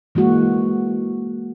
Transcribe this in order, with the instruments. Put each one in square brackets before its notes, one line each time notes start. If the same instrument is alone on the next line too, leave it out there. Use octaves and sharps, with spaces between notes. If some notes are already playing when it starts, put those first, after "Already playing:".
[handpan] E3 G#3 A#3 F#4